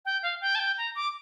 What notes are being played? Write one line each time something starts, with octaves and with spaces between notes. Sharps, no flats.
G5
F5
G5
A5
G5
A#5
D6